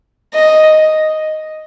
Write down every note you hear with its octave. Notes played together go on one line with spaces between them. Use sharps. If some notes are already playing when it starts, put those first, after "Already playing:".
D#5